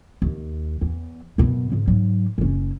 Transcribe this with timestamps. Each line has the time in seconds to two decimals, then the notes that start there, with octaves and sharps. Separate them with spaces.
0.22 D#2
0.81 E2
1.38 F#2 B2
1.72 G#2 D3
1.87 G#2 F#3
2.38 F#1 C#4